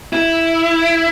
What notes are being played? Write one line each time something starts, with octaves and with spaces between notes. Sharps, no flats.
E4